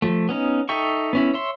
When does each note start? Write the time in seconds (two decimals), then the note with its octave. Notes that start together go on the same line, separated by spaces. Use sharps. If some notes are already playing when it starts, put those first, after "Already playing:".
0.02 F3 A3
0.29 B3 C#4 D#4
0.69 D#4 A4 E5 G5 C#6
1.13 B3 C#4 E4
1.34 C#5 E5 C6